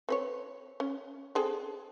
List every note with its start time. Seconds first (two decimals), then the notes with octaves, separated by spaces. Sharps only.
0.09 C4 B4 C#5
0.80 C#4
1.35 C4 G#4 A4